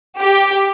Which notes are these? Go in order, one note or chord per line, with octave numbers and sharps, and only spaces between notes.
G4